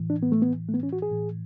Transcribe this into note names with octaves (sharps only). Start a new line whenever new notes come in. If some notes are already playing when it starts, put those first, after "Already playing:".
Already playing: A2 E3
D4
B3
A3
B3
A3
B3
C#4
F#4
G#4
A2 E3